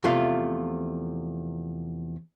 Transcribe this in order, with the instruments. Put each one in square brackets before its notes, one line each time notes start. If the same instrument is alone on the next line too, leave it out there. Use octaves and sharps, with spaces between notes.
[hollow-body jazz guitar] E2 C3 F3 A3 F4 F5